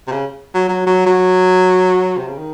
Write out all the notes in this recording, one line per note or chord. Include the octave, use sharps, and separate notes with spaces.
C3
C#3
F#3
F#3
F#3
F#3
C3
C#3
D#3